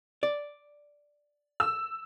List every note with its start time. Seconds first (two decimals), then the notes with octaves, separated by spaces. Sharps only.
0.23 D5
1.60 E6